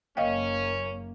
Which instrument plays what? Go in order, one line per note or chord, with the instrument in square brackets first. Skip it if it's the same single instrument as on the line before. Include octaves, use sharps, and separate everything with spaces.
[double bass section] F#1 A#3 [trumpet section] C#4 [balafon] D#5 F5 G5